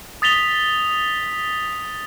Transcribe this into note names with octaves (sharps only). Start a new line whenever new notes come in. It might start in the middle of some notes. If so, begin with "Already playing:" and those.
D#6 A6 B6 F7 G7